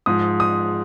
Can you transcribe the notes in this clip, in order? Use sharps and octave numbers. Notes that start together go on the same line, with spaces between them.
G#2 F3 D#6
D#6